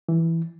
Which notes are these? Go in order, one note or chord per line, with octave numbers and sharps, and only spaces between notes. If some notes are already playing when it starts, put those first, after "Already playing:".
E3